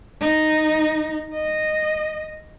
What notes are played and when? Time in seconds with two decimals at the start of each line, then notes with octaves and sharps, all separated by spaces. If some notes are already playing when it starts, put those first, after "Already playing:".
0.21 D#4
1.34 D#5